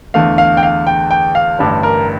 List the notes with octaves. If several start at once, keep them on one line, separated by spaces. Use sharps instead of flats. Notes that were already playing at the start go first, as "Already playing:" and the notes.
E2 D3 A3 F5
F5
G5
F5
G5
G5
F5
A1 G2 D3 G3
A#4